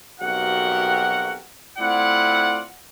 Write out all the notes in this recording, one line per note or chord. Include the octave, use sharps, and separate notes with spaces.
B1 F2 F#4 G4 A#4 F#5
A3 C4 E4 F4 D5 F#5